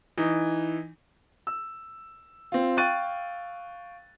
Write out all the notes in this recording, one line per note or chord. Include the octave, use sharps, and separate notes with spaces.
E3 D#4
E6
C4 F4
F5 G5 C#6 F#6 A6 D#7